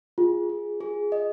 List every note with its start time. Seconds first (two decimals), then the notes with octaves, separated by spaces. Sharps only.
0.18 F4 G#4
0.49 G#4
0.81 G#4
1.12 D#5